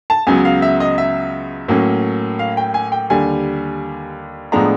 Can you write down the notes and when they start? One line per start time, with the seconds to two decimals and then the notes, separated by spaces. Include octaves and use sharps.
0.10 A5
0.27 C#2 C#3 F#3 B3 G#5
0.45 F5
0.62 E5
0.80 D#5
0.98 E5
1.68 A2 F#3 A#3 C#4
2.39 F5
2.57 G5
2.74 G#5
2.92 G5
3.10 D#2 D3 G3 G#5
4.52 A2 F3 G#3 B3 D4 A#5